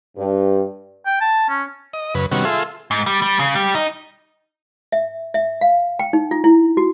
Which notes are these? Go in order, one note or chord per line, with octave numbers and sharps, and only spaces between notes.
G2
G5
A5
C#4
D#5
F#2 C#3 B4
C3 D#3 G3 B3 C#4 F#4
F4 G#4 A4 E5 C6
G#2
G3
G3
C#3
G3
D#4
E5
E5
F5
G5
D#4
F4
E4
F#4